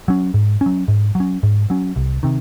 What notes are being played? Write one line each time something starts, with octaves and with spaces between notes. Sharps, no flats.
F#3 C#4
G#2
C#4
F#3
G#2
F#3
C#4
G#2
F#3 C#4
C2
C3 D#3